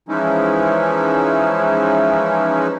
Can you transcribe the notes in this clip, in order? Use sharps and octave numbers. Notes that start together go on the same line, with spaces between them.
E3 F3 G#3 C#4 D#4 E4